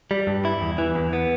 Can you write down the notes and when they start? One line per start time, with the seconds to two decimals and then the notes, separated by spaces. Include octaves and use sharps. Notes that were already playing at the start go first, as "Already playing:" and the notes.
0.11 G3
0.27 G2
0.45 E4
0.61 E2
0.78 E3
0.95 E2
1.13 B3